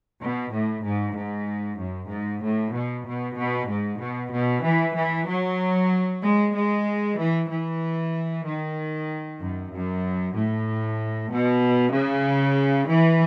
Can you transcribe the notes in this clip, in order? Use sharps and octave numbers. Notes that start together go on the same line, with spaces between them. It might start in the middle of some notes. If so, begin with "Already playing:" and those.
B2
A2
G#2
G#2
F#2
G#2
A2
B2
B2
B2
G#2
B2
B2
E3
E3
F#3
G#3
G#3
E3
E3
D#3
F#2
F#2
A2
B2
C#3
E3